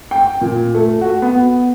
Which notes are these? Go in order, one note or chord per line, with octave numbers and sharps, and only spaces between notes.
G5
A#2
A3
F#4
B3